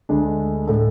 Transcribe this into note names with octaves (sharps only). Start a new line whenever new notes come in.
D2 D3 G#3 D4
A2 G#3 D4 A4